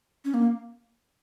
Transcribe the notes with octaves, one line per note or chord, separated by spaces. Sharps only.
C#4
A#3